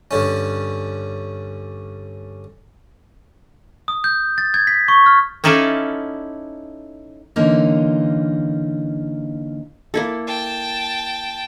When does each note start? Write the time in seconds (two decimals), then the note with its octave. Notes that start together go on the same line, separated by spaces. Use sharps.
0.11 G2 D3 C#4
3.88 D#6
4.04 G6
4.38 A6
4.54 G#6
4.67 B6
4.88 C#6
5.06 F6
5.44 C#4 D#4 E4 A4 D5 F5
7.36 D3 E3 A#3 C#4 D#4 F4
9.94 A#3 E4 A4
10.28 G5 A5